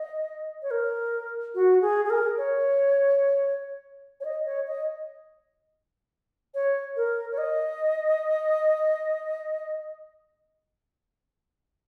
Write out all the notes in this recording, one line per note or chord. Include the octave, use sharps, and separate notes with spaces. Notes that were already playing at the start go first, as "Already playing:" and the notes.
Already playing: D#5
C#5
A#4
F#4
G#4
G#4
A#4
C#5
C#5
D#5
C#5
D#5
C#5
A#4
C#5
D#5